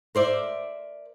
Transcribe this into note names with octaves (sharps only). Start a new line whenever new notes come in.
A#4 C5 D5 E5